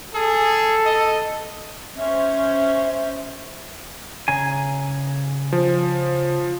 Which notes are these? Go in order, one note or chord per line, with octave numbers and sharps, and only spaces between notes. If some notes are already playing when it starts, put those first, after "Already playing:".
G#4 A4
D#5
C#4 C5 E5
C#3 G#4 G#5 A#5
F3